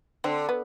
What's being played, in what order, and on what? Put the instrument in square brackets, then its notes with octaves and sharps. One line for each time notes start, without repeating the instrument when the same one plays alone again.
[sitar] D3 [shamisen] C4
[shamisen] B3